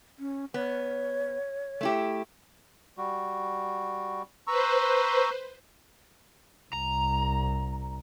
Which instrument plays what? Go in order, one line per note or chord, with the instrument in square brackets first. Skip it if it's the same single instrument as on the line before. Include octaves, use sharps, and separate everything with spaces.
[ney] C#4
[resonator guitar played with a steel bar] B3 [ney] C#5
[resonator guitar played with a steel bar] A3 E4 G4
[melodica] G3 F#4
[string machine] B4 C5 [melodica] A#5 C#6 E6
[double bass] C2 [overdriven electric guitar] A#5